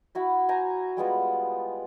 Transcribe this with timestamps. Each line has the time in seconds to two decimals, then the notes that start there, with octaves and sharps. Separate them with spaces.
0.15 E4 F#4 B5
0.49 C5 G#5 A#5
0.97 G3 G#3 B3 F4